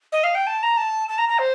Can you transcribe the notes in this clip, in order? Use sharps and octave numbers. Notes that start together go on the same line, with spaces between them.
D#5
F5
G5
A5
A#5
A5
A5
A#5
A#5
C5